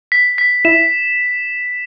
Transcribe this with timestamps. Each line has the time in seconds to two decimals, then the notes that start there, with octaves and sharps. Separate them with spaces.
0.12 B6
0.38 B6
0.65 E4 E5 E7